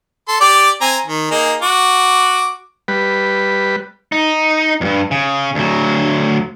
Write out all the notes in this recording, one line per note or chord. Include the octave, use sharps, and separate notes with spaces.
A4 C6
G4 D5 D6
C4 G#5 A#5
D#3
A#3 D#4 G#4
F#4 D6
G3 B4
D#4
E2 G2
C#3
D2 F#3